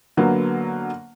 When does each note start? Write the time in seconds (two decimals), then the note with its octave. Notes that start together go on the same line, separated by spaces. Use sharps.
0.17 D3 F#3 A#3 B3